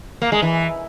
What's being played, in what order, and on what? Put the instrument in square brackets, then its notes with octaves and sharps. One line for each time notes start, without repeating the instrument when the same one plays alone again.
[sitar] A#3
G#3
E3